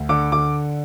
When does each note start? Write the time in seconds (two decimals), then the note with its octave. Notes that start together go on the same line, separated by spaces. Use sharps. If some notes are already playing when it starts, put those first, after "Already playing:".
Already playing: D2
0.09 D3 D6
0.32 D3 D6